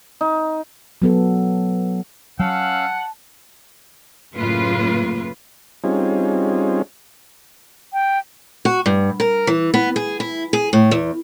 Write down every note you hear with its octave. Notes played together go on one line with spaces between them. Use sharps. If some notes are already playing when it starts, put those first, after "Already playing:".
D#4
F#3 B3 A4
F#3 C#4 F5 F#5 A5 E6
F#2 A2 C#3 A#3 F4 B4
G3 C4 C#4 D#4 F4 G#4
G5
F#4
G2
A#4
E3
B3
G#4
E4
G#4
A2
E2